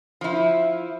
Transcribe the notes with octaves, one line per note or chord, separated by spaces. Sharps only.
F3 E4